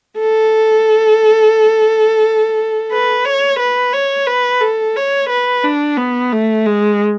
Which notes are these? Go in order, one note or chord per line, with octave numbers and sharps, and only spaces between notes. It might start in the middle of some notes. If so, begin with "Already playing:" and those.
A4
B4
C#5
B4
C#5
B4
A4
C#5
B4
D4
B3
A3
G#3